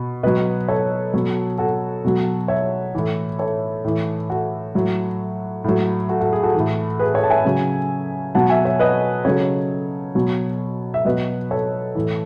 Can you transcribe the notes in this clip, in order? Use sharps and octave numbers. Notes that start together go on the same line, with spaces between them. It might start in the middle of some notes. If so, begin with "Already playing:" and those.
Already playing: B2
B2 F#3 B4 D#5
A4 C#5
B2 F#3
F#4 A4
B2 F#3
C#5 E5
A2 E3
A4 C#5
A2 E3
F#4 A4
A2 F#3
A2 F#3
F#4 A4
F#4 A4
G#4
F#4 A4
A2 E3
G#4 B4
A4 C#5
A5
E5 G#5
C#3 F#3
B2 F#3 F#5 A5
E5 G#5
C#5 E5
B4 D#5
C#3 F#3 A4 C#5
B2 F#3
E5
B2 F#3 B4 D#5
A4 C#5
A2 E3